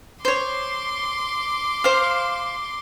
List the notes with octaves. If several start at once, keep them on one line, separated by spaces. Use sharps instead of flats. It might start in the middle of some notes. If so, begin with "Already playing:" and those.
C5 C#5 C6 D6
C5 F5